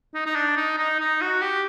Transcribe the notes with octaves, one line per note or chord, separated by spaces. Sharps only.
D#4
D#4
D4
D#4
D#4
D#4
F#4
G4